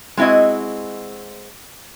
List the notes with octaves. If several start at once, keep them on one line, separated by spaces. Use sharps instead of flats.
G#3 C4 E4 F#4 D#5